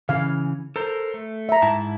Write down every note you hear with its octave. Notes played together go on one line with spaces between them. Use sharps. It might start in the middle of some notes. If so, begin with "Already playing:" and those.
C#3 E3 C#4 F5
A4 A#4 C5
A3
E5 A#5
G#2 E4 A5